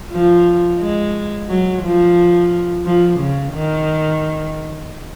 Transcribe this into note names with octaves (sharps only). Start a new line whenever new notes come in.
F3
G#3
F#3
F3
F3
C#3
D#3